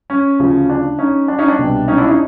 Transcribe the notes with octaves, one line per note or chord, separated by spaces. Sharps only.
C#4
D2 C#3 F3
D4
C#4 D#4
D4
C#4 D#4
D4
C2 B2 G3
C#4 D#4
D4 E4
C#4 D#4